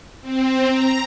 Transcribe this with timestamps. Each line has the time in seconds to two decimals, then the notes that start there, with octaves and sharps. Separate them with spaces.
0.21 C4
0.69 A#5